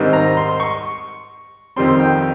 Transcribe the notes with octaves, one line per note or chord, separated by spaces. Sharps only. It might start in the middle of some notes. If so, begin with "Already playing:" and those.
Already playing: G#2 D#3 G3 C4
A#5
C6
C#6
F2 D#3 G3 C4 C6
G5